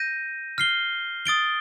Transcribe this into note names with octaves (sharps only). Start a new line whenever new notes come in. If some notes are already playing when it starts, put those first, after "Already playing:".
Already playing: G6 A#6 D#7
F6 C7 G7
D#6 A6 D7 G7